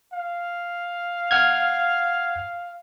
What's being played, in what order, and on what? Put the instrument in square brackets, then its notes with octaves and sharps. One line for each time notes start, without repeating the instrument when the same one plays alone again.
[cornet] F5
[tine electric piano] F#5 F6 G#6